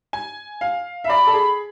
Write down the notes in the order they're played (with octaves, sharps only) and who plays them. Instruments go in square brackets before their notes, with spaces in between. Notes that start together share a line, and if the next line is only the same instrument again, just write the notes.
[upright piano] G#5
F5
E5
[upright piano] D5 [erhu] B5
[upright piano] A4
G#4